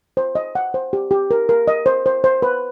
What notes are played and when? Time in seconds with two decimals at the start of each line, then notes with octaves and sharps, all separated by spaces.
0.17 C5
0.35 D#5
0.55 F#5
0.74 C5
0.93 G4
1.11 G4
1.31 A#4
1.49 A#4
1.68 D#5
1.86 C5
2.06 C5
2.24 C5
2.42 B4